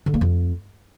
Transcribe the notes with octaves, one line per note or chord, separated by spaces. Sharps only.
D3
A#3
F2